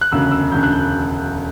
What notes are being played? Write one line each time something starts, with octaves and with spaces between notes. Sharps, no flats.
F#6
E1 D2 C#3 E6
E6
E1 D2 C#3 G6
F#6
G6